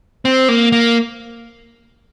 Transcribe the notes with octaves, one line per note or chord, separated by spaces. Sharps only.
C4
A#3
A#3